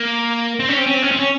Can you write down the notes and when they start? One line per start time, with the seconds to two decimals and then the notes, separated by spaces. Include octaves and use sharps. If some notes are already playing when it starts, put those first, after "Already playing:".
Already playing: A#3
0.60 C4
0.69 C#4
0.77 C4
0.86 C#4
0.94 C4
1.02 C#4
1.11 C4
1.19 C#4